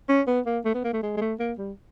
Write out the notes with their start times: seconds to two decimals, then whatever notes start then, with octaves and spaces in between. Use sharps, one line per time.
0.09 C#4
0.27 B3
0.46 A#3
0.65 A3
0.74 B3
0.84 A#3
0.93 A3
1.03 G#3
1.17 G#3
1.21 A3
1.40 A#3
1.58 G3